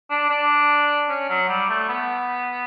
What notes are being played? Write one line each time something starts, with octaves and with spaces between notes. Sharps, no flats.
D4
D4
C#4
F#3
G3
A3
B3